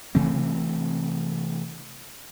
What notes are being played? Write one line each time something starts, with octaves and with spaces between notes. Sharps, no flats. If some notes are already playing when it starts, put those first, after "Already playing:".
C3 E3 A3 C4